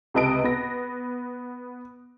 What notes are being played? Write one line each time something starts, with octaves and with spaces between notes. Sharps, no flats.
C#2 C3 B4 D#5 A5 D7
B3 A#6